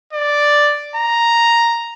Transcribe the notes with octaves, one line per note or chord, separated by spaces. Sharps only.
D5
A#5